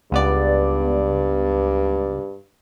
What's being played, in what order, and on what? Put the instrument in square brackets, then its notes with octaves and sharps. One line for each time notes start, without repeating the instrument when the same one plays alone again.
[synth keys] C#2 B3 D5 [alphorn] G2